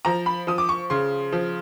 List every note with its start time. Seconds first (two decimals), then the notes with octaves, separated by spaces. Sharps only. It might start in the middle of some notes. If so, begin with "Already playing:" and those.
0.05 F3 A#5
0.26 B5
0.47 F3 D#6
0.58 D6
0.69 C#6
0.90 C#3 C6
1.32 F3